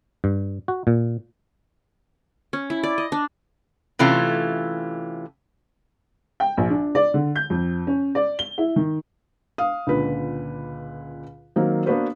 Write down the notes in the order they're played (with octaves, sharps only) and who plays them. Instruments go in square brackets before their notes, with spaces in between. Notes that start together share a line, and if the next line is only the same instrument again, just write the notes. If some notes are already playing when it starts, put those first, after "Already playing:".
[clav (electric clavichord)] G2
F#4
A#2
[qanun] C#4
E4
D5
D#5
D4
[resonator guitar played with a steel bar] C3 E3 A3 C#4 F4
[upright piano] G5
A#1
D4
D5
D3
G6
F2
C#4
D5
G7
E4
D#3
[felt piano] F5 D#6
C#2 A#2 D3 B4
D#3 F#3 A#3 C4
A#3 B3 D4 F#4 B4 C5